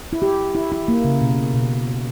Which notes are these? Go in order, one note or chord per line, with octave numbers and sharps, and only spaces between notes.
E4
G4
E4
E4
A#3
C#3
B2
B2